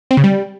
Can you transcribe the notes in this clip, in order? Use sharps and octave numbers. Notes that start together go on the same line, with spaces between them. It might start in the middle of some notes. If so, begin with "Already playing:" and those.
C4
C#3
G3